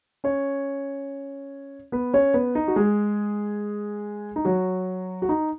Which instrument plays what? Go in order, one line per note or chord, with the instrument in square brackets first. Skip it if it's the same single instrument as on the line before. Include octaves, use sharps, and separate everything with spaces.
[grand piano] C#4 C#5
B3 B4
C#4 C#5
B3 B4
D#4
F#4
G#3 G#4
D#4
F#3 F#4
F#4
D#4